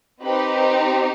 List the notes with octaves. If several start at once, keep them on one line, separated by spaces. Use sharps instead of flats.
C4 D#4 G4 B4